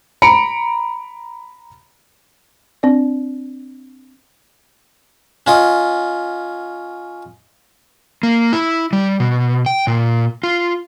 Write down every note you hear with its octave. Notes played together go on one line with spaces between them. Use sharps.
A#5 B5 C#7 D7
C4 D4 D5
C#4 F4 D#5
A#3
E4
G3
B2
G5
A#2
F4